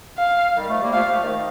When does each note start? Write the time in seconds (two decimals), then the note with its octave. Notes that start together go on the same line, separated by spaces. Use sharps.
0.18 F5
0.55 D#3 G3
0.68 F3 A3
0.81 G3 A#3
0.93 F3 A3 F5
1.12 F3 A3
1.22 D#3